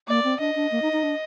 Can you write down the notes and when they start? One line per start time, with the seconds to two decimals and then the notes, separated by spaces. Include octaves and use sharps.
0.08 A#3 D5
0.24 C4
0.40 D4 D#5
0.56 D4
0.72 A#3
0.82 D#4
0.93 D#4
1.03 D4